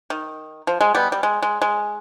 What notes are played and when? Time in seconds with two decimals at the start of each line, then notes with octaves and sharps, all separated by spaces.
0.10 D#3
0.67 F3
0.81 G#3
0.95 G3 B3
1.12 G3
1.23 G#3
1.42 G#3
1.62 G#3